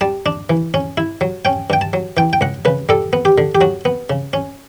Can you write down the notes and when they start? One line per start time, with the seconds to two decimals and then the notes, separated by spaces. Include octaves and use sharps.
0.01 G3 A5
0.26 D4
0.50 E3
0.74 C#4
0.98 E4
1.21 F#3
1.45 C#4 G5
1.70 G2 G5
1.81 A5
1.93 F#3
2.17 E3 G5
2.33 G5
2.41 C#2 F#5
2.65 C#3 B4
2.89 G3 A4
3.13 B3
3.25 G4
3.38 D3
3.55 G4
3.61 F#3 F#4
3.85 B3
4.10 C#3
4.33 C#4